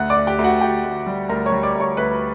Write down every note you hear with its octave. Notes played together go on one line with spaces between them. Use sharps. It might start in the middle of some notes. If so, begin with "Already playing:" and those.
Already playing: D2 F#5 F#6
D5 D6
D2
G4 G5
D2
F#4 F#5
D2 G4 G5
D2
G3
D2 A#4 A#5
C#5 C#6
G3
D5 D6
D2
C#5 C#6
D2 B4 B5